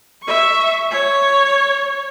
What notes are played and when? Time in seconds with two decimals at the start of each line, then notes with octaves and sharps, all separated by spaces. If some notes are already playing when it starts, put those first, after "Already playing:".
0.23 E5 C#6
0.91 C#5